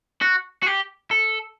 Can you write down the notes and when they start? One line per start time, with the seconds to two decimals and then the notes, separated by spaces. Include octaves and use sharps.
0.22 F#4
0.63 F#4
0.66 G4
1.11 A4